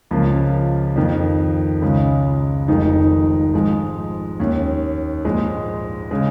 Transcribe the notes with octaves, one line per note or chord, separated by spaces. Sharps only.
C#2 C#3 F3 A#3
F2 D#3 A#3
C#2 C#3 G#3
F1 F2 D#3 G#3 D#4
G#2 F3 G#3
D#2 D#3 C#4
A#1 G#2 G#3
C#3 G#3